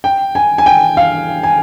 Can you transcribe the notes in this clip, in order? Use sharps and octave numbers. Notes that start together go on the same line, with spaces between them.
G5
G#5
G#5
G5
F5
G#5